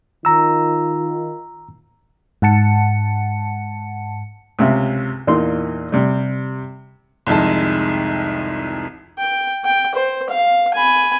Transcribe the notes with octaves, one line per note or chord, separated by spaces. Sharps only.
D#3 F4 A#5 E6
G#2 F#5 A5 C#7
C#2 C3 E5
E2 A#2 D#4 C6
C3 G3
C2 F2 D#3 G#3 A5
G5
G5
C5
F5
G#5 B5